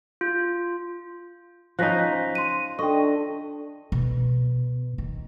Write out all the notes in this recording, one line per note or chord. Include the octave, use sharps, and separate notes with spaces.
F4
F3 C#4 D#4 F#6 A#6 B6
C6 D#7
D4 A4 D#5 G5 C#6
B2
D#3